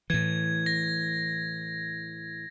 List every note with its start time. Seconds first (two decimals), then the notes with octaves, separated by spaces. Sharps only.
0.10 A2 E3 G#6
0.66 A#6